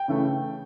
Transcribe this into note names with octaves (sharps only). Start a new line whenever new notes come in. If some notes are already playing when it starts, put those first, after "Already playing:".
Already playing: G5
C#3 E3 A3